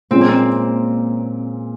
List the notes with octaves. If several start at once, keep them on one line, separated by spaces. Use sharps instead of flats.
A#2 G#3 C4 C#4
A#3
C4